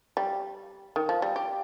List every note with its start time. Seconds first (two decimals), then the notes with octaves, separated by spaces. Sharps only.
0.17 G3
0.96 D#3
1.09 F3
1.22 G3
1.36 G4